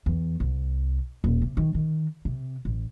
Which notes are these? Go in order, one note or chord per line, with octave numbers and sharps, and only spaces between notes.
E2
C2
D#1
C3
D#3
D#3
C3
A1